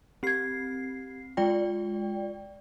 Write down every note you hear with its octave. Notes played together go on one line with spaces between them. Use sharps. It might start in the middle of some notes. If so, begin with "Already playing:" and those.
C4 G4 G#6 C7
G#3 F4 D5 G5